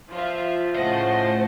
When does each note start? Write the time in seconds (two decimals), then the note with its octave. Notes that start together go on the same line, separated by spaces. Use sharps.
0.12 F3 F4 E5
0.76 A2 C#3 A3 C5 D#5 F#5 A5